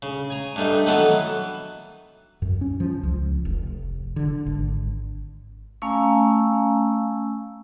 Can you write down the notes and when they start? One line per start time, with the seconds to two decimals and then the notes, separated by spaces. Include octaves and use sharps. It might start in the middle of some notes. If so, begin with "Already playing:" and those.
0.02 C#3
0.30 G#5 A#5
0.56 G2 A3 D#4
0.86 D#3 E3 F#3 B3 E4 A4
2.42 F#2
2.61 C#4
2.80 F3
3.03 C#2
3.45 F1
4.16 D3
4.46 G#1
5.82 A3 C#4 F5 G#5 A#5 E6